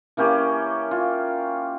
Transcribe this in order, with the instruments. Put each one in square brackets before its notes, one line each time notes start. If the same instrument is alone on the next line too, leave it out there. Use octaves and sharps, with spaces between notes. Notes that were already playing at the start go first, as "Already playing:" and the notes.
[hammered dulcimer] E3 A#3 C#4 G4
F4